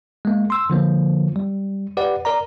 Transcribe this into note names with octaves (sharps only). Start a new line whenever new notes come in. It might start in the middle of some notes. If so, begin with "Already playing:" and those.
G#3 A#3
C6 E6
D3 F3 A#3
G3
G4 B4 D5 F#5
A#4 D5 A#5